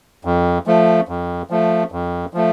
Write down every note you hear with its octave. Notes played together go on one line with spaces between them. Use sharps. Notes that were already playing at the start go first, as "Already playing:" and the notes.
F2
F3 A3
F2
F3 A3
F2
F3 A3